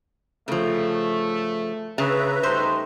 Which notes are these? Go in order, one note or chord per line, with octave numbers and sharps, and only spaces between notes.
C#3 F3 A3
C#3 B4 E5 A#5
G3 A3 D#4 C5